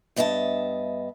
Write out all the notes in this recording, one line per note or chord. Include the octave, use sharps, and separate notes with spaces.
G2 B3 D#5 E5 A5